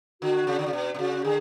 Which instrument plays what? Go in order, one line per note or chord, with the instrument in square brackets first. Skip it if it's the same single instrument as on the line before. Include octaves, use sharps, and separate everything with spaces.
[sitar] D3 [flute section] F#4
[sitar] C#3
D3
C#3
B2
B2
[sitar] C#3 [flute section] F#4
[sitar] D3 [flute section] G#4